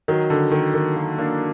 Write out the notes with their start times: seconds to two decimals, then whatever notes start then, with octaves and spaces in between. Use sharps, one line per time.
0.08 D#3 F#3
0.30 D3
0.52 D#3
0.74 D#3
0.96 F#3 A#3
1.18 A#3 D4